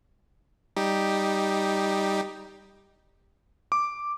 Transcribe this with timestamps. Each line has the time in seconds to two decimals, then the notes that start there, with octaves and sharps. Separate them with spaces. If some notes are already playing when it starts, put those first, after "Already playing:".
0.76 G3 D#4 G4
3.72 D6